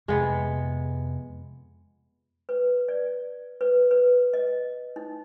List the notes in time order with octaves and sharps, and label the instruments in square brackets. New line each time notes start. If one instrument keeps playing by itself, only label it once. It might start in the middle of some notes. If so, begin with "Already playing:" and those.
[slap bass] F2 C3 [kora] G#3 B3
[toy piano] B4
D5
B4
B4
D#5
D#4